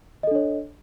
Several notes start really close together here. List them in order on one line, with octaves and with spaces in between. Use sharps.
D#5 A4 D4 C#5